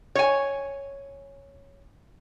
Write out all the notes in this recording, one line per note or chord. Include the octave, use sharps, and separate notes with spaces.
C#5 G#5